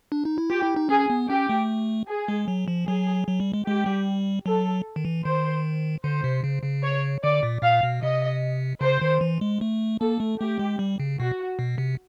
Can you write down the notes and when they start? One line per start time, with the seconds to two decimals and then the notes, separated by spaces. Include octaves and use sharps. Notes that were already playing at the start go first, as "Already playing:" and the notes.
0.12 D4
0.25 D#4
0.38 E4
0.50 F4 G4
0.63 E4
0.76 D#4
0.89 C#4 G#4
1.10 B3
1.29 C#4 G4
1.49 A3
2.08 G#4
2.28 G#3
2.48 F#3
2.68 F3
2.88 F#3 G#4
3.28 F#3
3.40 G3
3.54 G#3
3.66 G#3 G4
3.86 G3
4.46 F#3 A4
4.96 D#3
5.05 E3
5.25 D#3 C5
6.04 D3 C5
6.24 C3
6.44 C#3
6.63 C#3
6.83 C#5
7.23 D3 D5
7.43 A#2
7.62 A#2 F5
7.83 B2
8.02 C3 D#5
8.81 C#3 C5
9.01 D#3
9.21 E3
9.41 G#3
9.61 A3
10.00 A#3 A4
10.20 A3
10.40 A3 G4
10.59 G#3
10.79 G3
11.00 C#3
11.19 B2 F#4
11.59 B2
11.78 C3